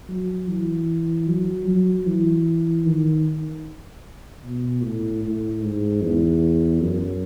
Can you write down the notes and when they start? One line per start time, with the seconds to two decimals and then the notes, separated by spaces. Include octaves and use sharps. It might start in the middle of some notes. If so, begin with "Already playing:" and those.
0.09 F#3
0.48 E3
1.28 F#3
1.68 F#3
2.07 E3
2.86 D#3
4.45 B2
4.83 A2
5.23 A2
5.63 G#2
6.03 E2
6.81 F#2